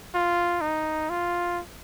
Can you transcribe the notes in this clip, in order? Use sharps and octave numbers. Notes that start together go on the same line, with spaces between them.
F4
D#4
F4